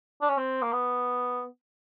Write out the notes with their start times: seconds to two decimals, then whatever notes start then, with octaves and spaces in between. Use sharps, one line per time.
0.22 D4
0.29 C#4
0.37 C4
0.62 A#3
0.72 B3